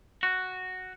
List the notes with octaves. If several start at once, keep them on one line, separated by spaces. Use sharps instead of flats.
F#4